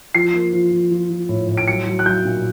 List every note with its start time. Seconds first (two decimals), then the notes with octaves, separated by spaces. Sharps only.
0.15 F3 C7
0.34 A#3
0.53 F3
0.71 F3
0.91 F3
1.10 F3
1.29 A2
1.48 A2
1.57 D7
1.68 F#3 C#7
1.87 F#3
1.99 F#6
2.06 F#3 G6
2.25 A#2